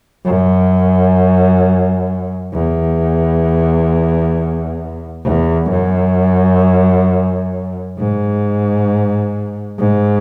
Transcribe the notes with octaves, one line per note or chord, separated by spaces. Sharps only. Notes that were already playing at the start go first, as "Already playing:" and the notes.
F#2
E2
E2
F#2
G#2
G#2